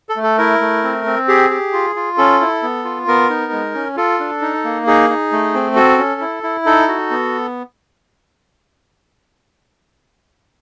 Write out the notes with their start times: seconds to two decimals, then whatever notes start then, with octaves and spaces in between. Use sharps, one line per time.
0.09 A4
0.16 A3
0.23 A4
0.38 E4 A#4
0.61 A3
0.83 C4
1.06 C4
1.28 G4 G#4
1.50 G4
1.73 F4
1.96 F4
2.18 C#4 A4
2.40 E4
2.63 B3
2.84 F4
3.08 B3 A#4
3.30 D#4
3.52 G#3
3.74 C#4
3.97 F4 A4
4.20 D4
4.41 D#4
4.64 A#3
4.87 D#4 G#4
5.10 D#4
5.32 A3
5.54 C4
5.76 F#4 A4
5.98 C#4
6.21 E4
6.43 E4
6.66 D#4 A4
6.88 F#4
7.11 B3